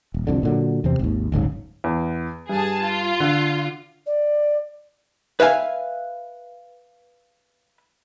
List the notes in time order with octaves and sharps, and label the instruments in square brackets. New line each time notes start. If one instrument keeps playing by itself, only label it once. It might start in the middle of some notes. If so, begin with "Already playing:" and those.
[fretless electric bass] D#1
C2 F2 D3
A#2 D3 F#3
E2 C3 C4
G#1 D#2
D1 G1 G#2 C#3
[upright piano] E2
[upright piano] G2 [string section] G#4 A5
[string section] F4
[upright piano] D3
[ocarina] D5
[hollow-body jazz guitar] B4 E5 F5 G#5